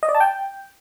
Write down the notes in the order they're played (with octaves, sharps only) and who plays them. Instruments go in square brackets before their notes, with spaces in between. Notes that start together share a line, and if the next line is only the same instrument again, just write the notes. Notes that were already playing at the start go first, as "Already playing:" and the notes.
[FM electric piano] D#5
D5
A5
G5